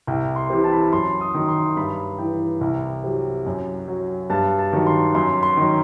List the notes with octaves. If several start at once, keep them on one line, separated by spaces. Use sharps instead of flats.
C2 G5
C6
C3 E3
A5
B5
A5
F#2 C6
D#6
D#3 F#3
C6
G2 B5
E3 G5
C2
C3 F#3
F#2
F#3
G2 A5
A5
D#3 F#3
C6
F#2 C6
C6
D#3 F#3